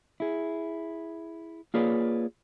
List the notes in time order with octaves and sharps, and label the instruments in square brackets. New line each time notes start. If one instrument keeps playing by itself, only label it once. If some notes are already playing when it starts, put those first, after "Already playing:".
[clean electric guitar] E4 G#4
A#3 F4 G#4 B4 C#5 D5